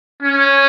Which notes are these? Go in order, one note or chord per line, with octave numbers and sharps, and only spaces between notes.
C#4